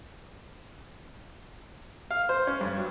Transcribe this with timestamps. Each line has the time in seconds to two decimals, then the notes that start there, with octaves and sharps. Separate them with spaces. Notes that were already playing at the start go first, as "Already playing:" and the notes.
2.11 F5
2.29 C5
2.47 C#4
2.61 G2
2.77 F#3